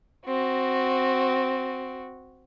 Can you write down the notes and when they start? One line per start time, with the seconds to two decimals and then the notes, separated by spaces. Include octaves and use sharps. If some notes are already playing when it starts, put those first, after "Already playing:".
0.27 C4 F#4